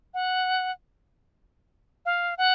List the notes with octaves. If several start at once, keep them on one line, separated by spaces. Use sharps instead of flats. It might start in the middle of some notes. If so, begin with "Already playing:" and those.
F#5
F5
F#5